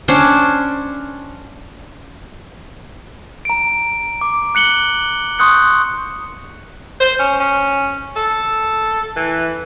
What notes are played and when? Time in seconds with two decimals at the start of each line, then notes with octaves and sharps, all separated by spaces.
0.08 C#4 D4 C5 G5
3.45 A#5 D7
4.21 D6
4.55 F#6 C#7 F#7 G7
5.39 C6 C#6 D#6 F#6 G6 C#7
7.00 C5
7.19 C#4
7.40 C#4
8.16 A4
9.16 E3